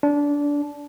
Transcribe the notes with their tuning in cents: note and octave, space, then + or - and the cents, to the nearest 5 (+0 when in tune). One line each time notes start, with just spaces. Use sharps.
D4 -20